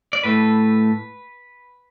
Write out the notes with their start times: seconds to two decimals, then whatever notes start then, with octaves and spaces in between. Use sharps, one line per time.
0.13 D5
0.23 A2 A3 B4